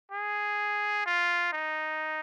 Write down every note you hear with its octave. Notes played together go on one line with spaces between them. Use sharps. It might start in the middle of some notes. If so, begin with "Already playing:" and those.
G#4
F4
D#4